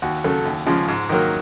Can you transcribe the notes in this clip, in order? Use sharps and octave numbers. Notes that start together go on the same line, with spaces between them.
D#2 F#4
C#3 F#3 A3
D#2
C#3 F3 G#3
G#2
D#3 F#3 A#3